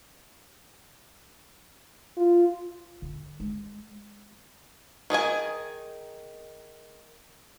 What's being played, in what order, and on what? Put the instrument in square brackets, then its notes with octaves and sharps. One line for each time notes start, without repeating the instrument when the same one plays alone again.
[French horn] F4
[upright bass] D3
G#3
[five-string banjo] D#3 G#4 D#5 G#5